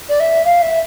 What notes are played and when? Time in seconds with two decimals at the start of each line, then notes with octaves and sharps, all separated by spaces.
0.09 D5
0.20 E5
0.45 F5
0.62 E5